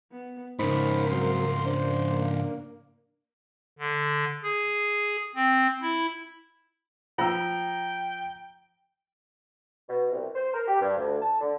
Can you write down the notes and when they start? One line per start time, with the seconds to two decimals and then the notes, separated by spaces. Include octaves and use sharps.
0.12 B3
0.59 G#2 C#3 D#4 A#4 C5 B5
1.11 F#3 C4 C6
1.66 D4 C5
2.08 A#3
3.79 D3
4.43 G#4
5.35 C4
5.82 E4
7.19 F3 G5 A#5 E6
9.89 B2
10.11 C2
10.35 C5
10.54 A#4
10.67 G4
10.81 G2
10.97 D2
11.21 A5
11.41 D3